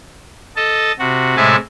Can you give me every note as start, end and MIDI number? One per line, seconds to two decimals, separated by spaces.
0.56 0.92 69
0.56 0.92 75
0.56 0.92 81
0.99 1.37 48
0.99 1.37 66
1.37 1.56 45
1.37 1.56 48
1.37 1.56 56
1.37 1.56 76
1.37 1.56 80
1.37 1.56 81